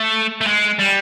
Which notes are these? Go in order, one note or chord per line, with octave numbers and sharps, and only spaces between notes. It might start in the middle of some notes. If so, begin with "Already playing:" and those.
Already playing: A3
A3
G#3
G3